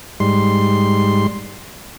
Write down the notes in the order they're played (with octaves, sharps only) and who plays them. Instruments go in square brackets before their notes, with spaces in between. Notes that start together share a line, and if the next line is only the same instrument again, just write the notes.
[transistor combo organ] G#2 G3 C6